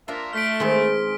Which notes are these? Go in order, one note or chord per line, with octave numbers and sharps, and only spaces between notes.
A#3 D4 F4 A#4 E5
A3 F6 B6 D7
D#3 G#3 B3 C4